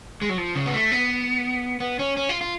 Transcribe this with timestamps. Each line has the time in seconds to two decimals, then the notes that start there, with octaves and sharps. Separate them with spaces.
0.22 G#3
0.29 F#3
0.38 F3
0.55 C#3
0.66 B3
0.74 A3
0.92 B3
1.80 B3
1.99 C#4
2.17 C#4
2.29 F4
2.41 F4